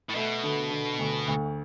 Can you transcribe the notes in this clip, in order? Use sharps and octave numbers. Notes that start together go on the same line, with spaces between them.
A2
B2 A3
D3
D3
D2
D2